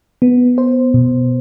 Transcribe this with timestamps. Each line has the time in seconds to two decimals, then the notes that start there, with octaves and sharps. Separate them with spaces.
0.22 B3
0.58 C5
0.94 B2